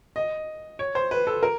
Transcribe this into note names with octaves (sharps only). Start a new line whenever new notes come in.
D#5
C#5
C5
B4
A4
A#4